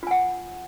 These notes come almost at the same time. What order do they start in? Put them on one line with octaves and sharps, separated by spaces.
F4 G#5 F#5